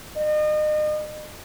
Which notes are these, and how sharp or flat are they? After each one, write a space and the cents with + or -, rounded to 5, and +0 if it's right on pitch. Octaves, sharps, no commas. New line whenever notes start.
D#5 -35